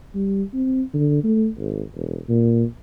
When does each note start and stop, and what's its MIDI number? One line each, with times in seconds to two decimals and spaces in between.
0.15 0.43 55
0.54 0.82 60
0.94 1.22 50
1.24 1.48 57
1.59 1.82 32
1.95 2.19 28
2.29 2.64 46